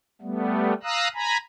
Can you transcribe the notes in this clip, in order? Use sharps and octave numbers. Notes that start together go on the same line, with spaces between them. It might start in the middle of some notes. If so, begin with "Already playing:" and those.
G3 A3 B3
F5 A#5 D#6 E6 F#6
G#5 A#5 B5